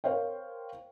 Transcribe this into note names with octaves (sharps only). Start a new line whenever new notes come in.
A#4 C5 C#5 F5 G5